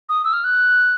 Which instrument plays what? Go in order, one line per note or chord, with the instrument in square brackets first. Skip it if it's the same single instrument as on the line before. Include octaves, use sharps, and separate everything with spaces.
[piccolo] D#6
E6
F6
F#6